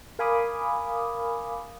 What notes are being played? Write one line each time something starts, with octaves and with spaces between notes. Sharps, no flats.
A#4 F5 G#5 B5 D6 D#6